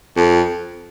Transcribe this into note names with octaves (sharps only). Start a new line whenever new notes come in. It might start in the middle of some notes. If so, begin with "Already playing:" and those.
F2